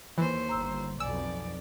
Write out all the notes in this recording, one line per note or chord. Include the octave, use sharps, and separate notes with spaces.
D#2 E3 C5
G1 A#5 E6
B1 F2 D5 G#5 E6